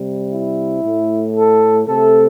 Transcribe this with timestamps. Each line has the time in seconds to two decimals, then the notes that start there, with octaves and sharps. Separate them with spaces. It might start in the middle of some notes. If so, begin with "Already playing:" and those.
Already playing: C3 G3
0.33 E4
0.84 A2 A3
1.35 A4
1.87 C3 A3 A4